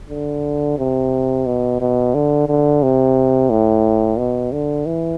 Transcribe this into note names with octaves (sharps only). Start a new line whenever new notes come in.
D3
C3
B2
B2
D3
D3
C3
A2
B2
D3
E3